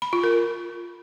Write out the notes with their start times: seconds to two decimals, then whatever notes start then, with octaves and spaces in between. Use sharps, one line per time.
0.02 B5
0.13 F4
0.24 A#4